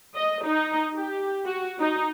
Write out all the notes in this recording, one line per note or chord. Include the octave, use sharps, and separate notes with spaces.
D#5
D#4
G4
F#4
D#4